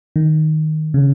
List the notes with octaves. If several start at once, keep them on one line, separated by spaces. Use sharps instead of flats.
D#3
C#3